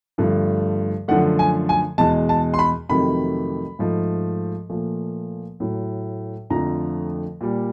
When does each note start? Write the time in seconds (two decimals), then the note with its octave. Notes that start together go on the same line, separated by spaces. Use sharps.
0.18 G2 D3 F3 A3
1.08 F#2 D3 F3 A3 F#5
1.39 G#5
1.69 G#5
1.98 E2 B2 G#3 A5
2.29 A5
2.54 C6
2.59 B5
2.89 F2 C3 D#3 F#3 A3 B5
3.79 G#2 F3 A3
4.69 A#2 F3 A3
5.60 A2 F#3 A3
6.50 F2 D3 F3 A3 A#5
7.41 A#2 G3